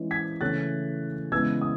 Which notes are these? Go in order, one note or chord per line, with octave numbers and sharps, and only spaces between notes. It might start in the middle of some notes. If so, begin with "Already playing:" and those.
Already playing: E3 G#3 C#4
G#6 B6
C#3 E3 A3 C#4 F#6 A6
C#3 E3 G#3 B3 E6 G#6
D#6